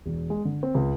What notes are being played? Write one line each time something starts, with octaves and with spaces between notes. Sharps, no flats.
E1
G#3
D3
C4
C#2